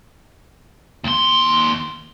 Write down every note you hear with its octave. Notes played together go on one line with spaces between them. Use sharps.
D#2 C6